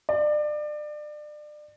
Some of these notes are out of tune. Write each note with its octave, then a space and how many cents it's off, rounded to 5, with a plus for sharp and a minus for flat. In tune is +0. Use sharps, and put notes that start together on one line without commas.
D5 +30